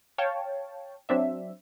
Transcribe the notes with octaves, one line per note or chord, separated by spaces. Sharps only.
C#5 F5 G5 A5
F#3 C4 D4 E5